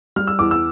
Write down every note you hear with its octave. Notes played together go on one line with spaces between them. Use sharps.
G3 F6
E6
E2 D6
E6